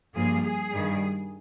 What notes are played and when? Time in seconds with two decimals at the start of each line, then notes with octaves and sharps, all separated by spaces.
0.14 G2 F3 A#3 G#4
0.43 G#4
0.71 G2 D#3 G3